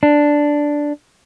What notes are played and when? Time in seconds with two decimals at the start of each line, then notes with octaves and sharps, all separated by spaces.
0.03 D4